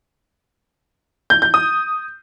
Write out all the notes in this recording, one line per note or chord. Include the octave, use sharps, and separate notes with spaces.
G6
G6
D#6